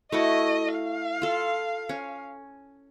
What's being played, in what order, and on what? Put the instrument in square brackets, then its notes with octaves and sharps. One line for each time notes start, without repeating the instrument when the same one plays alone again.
[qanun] A3 E4 F#4 [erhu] D#5
[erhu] F5
[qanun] F4 A4
C#4